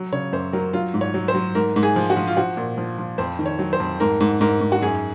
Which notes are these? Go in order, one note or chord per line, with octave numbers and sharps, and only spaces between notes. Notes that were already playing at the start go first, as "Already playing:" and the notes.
Already playing: F#3
C#3 C#5
F#2 C5
F#3 A#4
F#3 F4
G#2
C#5
F#3
C5
F#3
G#2 A#4
G#2
G#4
F3
F#4
F3
F4
F3 F#4
A#2
F3
F3
F2 C5
D#3
C#5
F#3
C5
F2
G#2 A#4
G#2
G#2 A#4
G#2
F#4
F#2 G#4